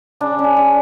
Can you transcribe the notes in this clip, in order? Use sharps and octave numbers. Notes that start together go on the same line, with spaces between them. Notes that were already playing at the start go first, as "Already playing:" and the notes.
C#3 D4
C#4
C#3
D4